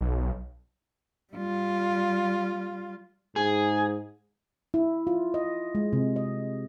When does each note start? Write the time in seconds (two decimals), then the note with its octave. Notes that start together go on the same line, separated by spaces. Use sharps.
0.01 B1
1.33 G3 F4
3.36 G#2 G#4
4.74 E4
5.07 F4
5.34 D#5
5.75 G#3
5.93 C3
6.16 D#5